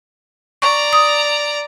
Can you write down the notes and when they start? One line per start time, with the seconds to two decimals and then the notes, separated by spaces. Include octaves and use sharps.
0.62 D5 A#5 C#6
0.93 D#6